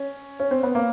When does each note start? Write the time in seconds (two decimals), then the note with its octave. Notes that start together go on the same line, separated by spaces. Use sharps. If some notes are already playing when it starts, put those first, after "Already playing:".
Already playing: C#4
0.40 C#4
0.51 C4
0.63 B3
0.75 A#3